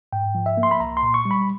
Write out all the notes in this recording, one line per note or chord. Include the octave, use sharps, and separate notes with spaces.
G#2 G5
F3
E5
A#3
C6
B5
C2 A#5
C6
A#2
C#6
G3
B5